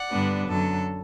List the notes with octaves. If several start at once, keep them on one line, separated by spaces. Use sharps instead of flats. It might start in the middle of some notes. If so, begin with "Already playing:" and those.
Already playing: D5 F#5
G2 D3 G3 B3 D4
F#2 D3 F#3 A4